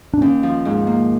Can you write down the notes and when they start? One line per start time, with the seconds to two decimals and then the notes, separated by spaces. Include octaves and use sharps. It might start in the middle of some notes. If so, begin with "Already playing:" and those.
0.14 D4
0.21 D#2 C#4
0.43 F3
0.65 G#2
0.87 A#3